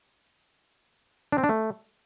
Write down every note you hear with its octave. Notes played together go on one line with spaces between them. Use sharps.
D4
C4
D4
A3